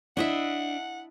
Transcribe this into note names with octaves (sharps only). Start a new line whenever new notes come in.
D4 E4 D#5 E5 F#5